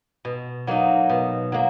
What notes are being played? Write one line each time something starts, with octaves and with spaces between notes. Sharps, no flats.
B2
F#3 A#3 D#4
B2
F#3 A#3